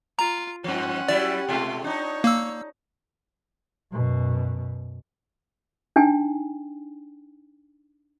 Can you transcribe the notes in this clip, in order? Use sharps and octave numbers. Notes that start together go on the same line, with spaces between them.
F4 A#5
G2 F3 C#4 F#5
F#3 G3 E4 D5
B2 G#3 A3 F4
D4 D#4 C#5
A#3 E6
F#2 B2
D4 D#4 G5 G#5